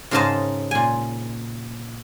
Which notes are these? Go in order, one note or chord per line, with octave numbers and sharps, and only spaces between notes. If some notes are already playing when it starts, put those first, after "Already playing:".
G#2 C#3 A#4 C5 D#5 A5
A#2 G#5